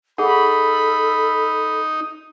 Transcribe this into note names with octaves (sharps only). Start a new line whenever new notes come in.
D#4 G#4 A4 F#5 B5